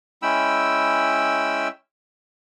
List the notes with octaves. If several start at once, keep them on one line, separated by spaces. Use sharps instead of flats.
G#3 C#4 E4 G5 B5 E6